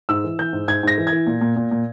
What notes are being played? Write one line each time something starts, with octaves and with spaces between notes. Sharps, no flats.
G#2 E6
E3
E3 G6
G#2
G#2 G#6
G#2 A#6
E3
G#6
E3
A#2
A#2
A#2
A#2